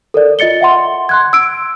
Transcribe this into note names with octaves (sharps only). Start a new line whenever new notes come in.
A4 A#4 D5
F4 D#5 A6 C#7 G7
E5 F#5 C6
C6 F#6 G#6
E6 D7